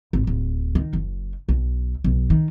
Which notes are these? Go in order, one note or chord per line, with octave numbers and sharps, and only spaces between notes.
G#1
D1
D#3
F#1
B1
B1
D#3